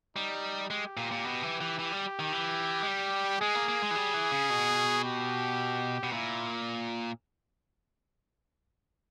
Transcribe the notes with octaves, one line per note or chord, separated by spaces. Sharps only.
G3 D#4
G#3 G4
A#2
A#2
B2
E3
E3
E3 G4
G3
D#3
E3
G#3
G3
G#3 G#4
A#3
A#3
G#3
E3
G3
E3
C#3
B2
G4
B2
A#2 E4